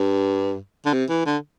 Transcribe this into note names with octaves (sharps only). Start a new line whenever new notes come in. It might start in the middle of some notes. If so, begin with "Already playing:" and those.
Already playing: G2
D3
C3
E3
D3